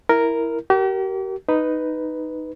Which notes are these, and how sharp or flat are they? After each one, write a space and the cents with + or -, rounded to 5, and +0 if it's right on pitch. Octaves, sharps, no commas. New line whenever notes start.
E4 +0 A#4 +0
G4 -40 A#4 +0
D#4 +0 B4 +5